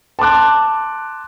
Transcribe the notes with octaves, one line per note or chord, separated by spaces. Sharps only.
A5 C6 D6 F#6